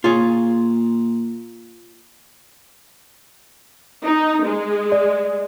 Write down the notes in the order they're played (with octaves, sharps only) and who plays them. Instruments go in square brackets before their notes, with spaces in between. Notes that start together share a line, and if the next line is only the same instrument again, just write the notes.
[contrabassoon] A#2 [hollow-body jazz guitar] F4 G#4 C#5
[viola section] D#4
G#3
[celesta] D5